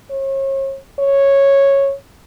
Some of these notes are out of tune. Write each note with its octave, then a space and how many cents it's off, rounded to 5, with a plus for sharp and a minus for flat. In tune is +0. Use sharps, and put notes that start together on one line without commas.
C#5 -40
C#5 -10